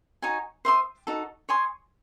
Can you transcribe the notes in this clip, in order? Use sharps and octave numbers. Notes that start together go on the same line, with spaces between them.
D#4 F#4 C#5 G#5
C5 E5 C6 D#6
D#4 F#4 A4
C#5 G#5 C6 D#6